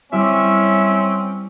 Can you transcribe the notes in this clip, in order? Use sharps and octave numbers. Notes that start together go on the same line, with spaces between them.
G3 C4 C#4 E4 G4 E5